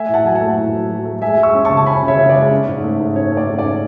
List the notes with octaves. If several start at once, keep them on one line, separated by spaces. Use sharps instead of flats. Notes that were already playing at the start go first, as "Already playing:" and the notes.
Already playing: A3 E5 G#5
A2
F#5 A5
F#3 G#5
F#5 A5
A3
A2
F#3
F#3
A3
G#3 E5 G#5
G#3
C#6 E6
C#4
C#3 A5 C#6
A5
C#4 G#5 B5
C#3
C#5 E5
C#3
D5
G#3
C#4
G#2
A3
G#2
C#4 C#5
A3
D5
G#2
D5
C#4